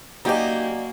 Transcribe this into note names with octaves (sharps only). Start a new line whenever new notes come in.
F#3 A#3 C#4 D#4 G4 D5 D#5